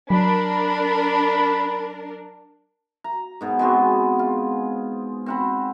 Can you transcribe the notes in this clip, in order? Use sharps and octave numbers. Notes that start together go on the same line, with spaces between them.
F#3 D4 A#4 B5
A#5
G#2 B2 G#4
G#3 B3 C4 F#4
F4
C4 F#5 B5